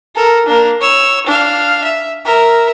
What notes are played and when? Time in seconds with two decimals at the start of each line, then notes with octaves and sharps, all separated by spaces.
0.16 A4 A#4
0.46 A#3 D4
0.81 C#5 E6
1.27 D4 F5
1.84 E5
2.25 A#4 E5